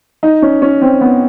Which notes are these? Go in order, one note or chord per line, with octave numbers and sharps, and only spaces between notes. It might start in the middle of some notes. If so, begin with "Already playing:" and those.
D#4
C#4
C#4
C4
B3